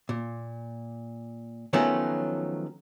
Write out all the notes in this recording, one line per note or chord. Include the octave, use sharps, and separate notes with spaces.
A#2
D#3 F3 F#3 A3 B3 C#4